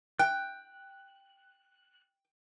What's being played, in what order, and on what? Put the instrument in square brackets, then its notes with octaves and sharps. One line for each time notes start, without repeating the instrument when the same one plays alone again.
[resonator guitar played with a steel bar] G5 [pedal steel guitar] F#6